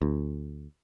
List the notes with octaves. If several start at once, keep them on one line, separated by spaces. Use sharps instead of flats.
D2